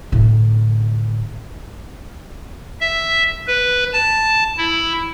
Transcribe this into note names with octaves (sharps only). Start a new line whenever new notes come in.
A2 D3
E5
B4
A5
E4